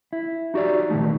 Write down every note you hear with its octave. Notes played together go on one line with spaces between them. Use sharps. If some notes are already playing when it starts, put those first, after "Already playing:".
E4
D#4 F#4 G4 D5
A#2 D#3 F3 A3 D#4